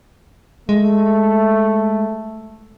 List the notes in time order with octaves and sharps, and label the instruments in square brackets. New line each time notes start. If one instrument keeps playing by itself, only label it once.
[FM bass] G#3 [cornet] A3